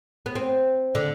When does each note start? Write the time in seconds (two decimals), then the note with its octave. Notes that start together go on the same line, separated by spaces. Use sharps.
0.26 B3
0.35 C4
0.95 D3